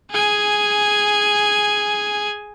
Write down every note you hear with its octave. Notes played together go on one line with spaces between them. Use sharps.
G#4 G#5